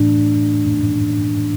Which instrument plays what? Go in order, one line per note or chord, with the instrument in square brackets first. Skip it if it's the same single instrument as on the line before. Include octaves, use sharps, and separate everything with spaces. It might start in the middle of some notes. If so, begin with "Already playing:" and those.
Already playing: [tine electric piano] A2 E3 A3 D4